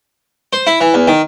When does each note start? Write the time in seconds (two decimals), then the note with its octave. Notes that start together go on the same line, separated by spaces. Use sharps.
0.53 C5
0.67 E4
0.81 E3
0.94 E2
1.08 D#3